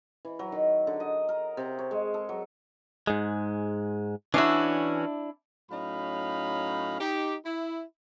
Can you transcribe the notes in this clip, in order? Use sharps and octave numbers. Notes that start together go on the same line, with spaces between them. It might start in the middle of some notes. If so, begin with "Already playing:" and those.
E3
F#3
D#3
D3
D#5
A#4
C3
C#5
G#3
A4
F#3
G#2 G#3
E3 C#4 D4 E4 F#4
A2 F#3 C#4 D#4 F5 B5
D#4 G4
E4